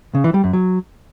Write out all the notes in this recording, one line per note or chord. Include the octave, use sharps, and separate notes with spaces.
C#3
E3
G3
F#2
F#3